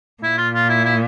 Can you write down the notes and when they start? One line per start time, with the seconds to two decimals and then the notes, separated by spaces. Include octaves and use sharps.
0.23 A#2 E4
0.38 F4
0.54 F4
0.69 E4
0.85 E4